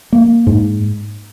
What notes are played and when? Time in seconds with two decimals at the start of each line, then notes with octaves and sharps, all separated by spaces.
0.13 A#3
0.47 G#2